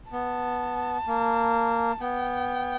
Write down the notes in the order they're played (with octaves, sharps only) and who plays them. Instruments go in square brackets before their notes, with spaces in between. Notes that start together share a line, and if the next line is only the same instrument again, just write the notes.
[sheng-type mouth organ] B3 [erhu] A5
[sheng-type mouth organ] A#3
[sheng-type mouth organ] B3 [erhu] G5